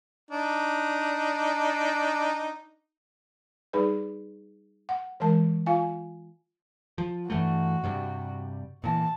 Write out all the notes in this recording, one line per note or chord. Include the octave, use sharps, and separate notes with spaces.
D4 D#4
G3 D#4 G#4 B4 D5
F#5
E3 G#3 A#4 A5
F4 F5 G#5
F3
G2 E3 A3 F#4
G2 C3 G3
A#2 E3 A5